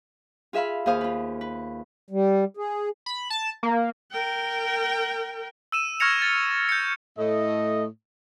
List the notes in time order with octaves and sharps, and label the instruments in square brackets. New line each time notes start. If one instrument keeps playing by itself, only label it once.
[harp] F4 G#4 E5 F5 B5
D#2 G#4 C5 F5 D#6
F4 B4
B4
[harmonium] G3
G#4
[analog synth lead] B5
A5
A#3
[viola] A#4 G5
[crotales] E6 D#7 E7
C#6 F6 G#6 A#6 C#7 F7
A6
G6 C#7
[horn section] A2 A3 D#5